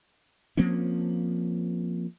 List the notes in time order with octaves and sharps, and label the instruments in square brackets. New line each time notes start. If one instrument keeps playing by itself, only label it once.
[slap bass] F3 A#3 C4 C#4